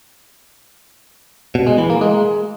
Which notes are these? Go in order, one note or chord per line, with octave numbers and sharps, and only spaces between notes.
B2
G#3
E3
A#3
G#3